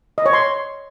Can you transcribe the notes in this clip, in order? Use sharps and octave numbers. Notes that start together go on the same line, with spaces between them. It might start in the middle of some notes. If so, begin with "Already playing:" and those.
D#5
C#5
C6